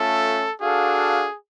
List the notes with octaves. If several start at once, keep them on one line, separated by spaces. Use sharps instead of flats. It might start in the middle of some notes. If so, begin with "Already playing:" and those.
Already playing: A3 C#4 F4 A4
D4 F#4 G#4 A4 F5